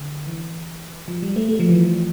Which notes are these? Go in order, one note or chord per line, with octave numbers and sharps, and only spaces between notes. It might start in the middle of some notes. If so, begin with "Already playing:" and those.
Already playing: D3
E3
F3
G3
A3
A3
F3
E3